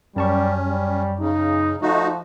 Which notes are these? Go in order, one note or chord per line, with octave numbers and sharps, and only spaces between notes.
F#2 G3 C#4 A5 C#6
G3
C#3 D#4
F3 A3 D#4 F#4